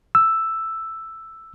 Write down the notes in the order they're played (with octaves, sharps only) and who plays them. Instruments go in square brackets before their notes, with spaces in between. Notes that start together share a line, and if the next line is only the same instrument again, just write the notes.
[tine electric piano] E6